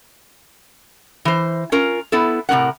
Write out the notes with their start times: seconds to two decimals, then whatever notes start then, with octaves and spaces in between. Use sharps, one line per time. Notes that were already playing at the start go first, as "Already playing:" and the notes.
1.25 E3 C5
1.72 C#4 F4 A#4
2.12 B3 E4 A4
2.49 A2 C3 C#4 A#4 F#5